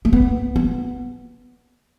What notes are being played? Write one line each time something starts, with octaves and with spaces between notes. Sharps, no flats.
A3
B3
B3